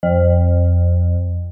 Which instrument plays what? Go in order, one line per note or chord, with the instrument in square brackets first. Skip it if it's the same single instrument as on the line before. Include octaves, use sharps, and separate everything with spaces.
[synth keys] F2